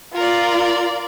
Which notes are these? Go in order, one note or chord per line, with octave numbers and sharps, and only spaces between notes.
F4 A#4 D5